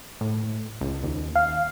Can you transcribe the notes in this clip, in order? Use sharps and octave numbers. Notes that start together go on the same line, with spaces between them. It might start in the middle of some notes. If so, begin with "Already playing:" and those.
A2
C#2
D#2
F5